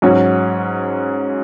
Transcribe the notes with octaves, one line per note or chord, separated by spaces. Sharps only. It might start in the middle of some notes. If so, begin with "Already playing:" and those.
G#2 F#3 C#4 F#4